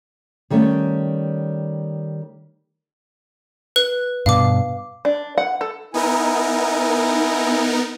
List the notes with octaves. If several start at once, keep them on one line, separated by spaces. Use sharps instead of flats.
D#3 G3 A3 C#4
B4 F#6
G2 B2 F5 D6
D4
F#5
A4
B3 D#4 E4 A#4 G#5